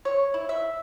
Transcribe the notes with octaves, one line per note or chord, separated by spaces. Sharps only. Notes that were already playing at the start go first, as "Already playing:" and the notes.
C#5
E4
E5